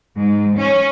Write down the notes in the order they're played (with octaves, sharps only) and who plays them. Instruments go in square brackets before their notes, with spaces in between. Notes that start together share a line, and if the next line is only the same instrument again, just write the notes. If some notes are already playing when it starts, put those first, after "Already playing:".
[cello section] G#2
C#4